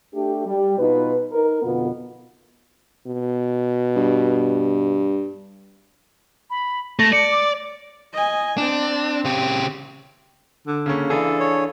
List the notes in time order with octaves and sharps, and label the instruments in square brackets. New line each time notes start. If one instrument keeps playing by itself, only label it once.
[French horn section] A3 D4 G4
G3
B2 D#4 F4 B4
D#4 A#4
F2 B2 D3 B3 F4
[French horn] B2
[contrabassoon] G2
[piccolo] B5
[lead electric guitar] A3 [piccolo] A#6
[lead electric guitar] D5 [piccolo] C#7
[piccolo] D6
[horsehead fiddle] D#5 G#5
[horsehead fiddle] C4 [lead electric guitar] D4
[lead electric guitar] C#3 G4
[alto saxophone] D3
[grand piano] C#3 A#3 C#4
[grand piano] E3 F5 [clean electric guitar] D4 G#4 [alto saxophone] A4
[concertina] C#5